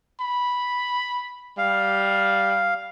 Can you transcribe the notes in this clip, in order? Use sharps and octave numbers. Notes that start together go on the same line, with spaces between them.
B5
G3 F5